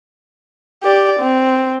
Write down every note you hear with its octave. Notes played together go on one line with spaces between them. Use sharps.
G4 D5
C4